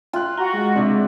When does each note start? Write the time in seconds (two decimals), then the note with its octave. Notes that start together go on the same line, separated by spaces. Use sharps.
0.13 F4 G5 F#6
0.38 F#4 A#5 G7
0.53 G#3
0.76 C3 D4